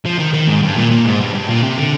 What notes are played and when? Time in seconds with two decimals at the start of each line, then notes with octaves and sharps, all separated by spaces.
0.05 F3
0.19 D#3
0.33 D#3
0.48 G#2
0.62 G2
0.76 A#2
0.92 A#2
1.05 G#2
1.20 G2
1.34 G2
1.49 A#2
1.63 C3
1.78 D3